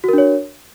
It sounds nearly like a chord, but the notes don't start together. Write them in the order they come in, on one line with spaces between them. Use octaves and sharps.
F#4 A#4 D4 C#5